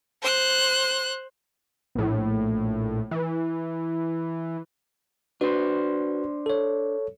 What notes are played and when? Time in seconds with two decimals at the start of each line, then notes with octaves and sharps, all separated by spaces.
0.23 C5 F#6
1.95 A#1 A2
3.11 E3
5.41 D4 F#4 B4 C5
6.46 A4 C#5